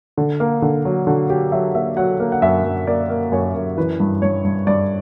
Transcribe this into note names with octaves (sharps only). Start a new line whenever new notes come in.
D3
A#3
D3
F#3
D3 F#4
F#3 G4
F#3 E5
A#3 E5
F#3 F#5
A#3
F#5
F#2 E5
F#2
A#3 D5
A#3
F#2 C#5
F#2
E3 B4
G2
G2 C#5
G2
G2 D5